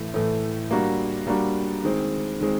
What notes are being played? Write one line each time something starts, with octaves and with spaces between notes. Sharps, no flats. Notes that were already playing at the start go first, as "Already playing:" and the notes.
Already playing: A2 E3 A3
A2 E3 A3
G3 A#3 D4 F#4
G3 A#3 D4 F#4
D#3 G#3 C4
D#3 G#3 C4